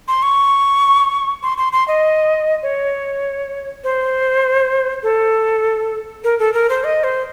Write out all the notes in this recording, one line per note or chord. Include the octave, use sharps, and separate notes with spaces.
C6
C#6
C6
C6
C6
D#5
C#5
C5
A4
A#4
A4
A#4
C5
D#5
C5